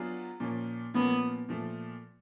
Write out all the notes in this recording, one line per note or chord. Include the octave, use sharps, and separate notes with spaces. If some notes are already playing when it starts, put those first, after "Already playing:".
Already playing: F#3 B3 D4 F4 G#4
A#2 F3 A#3 C#4
A#2 F3 A#3 B3 C#4
A#2 F3 A3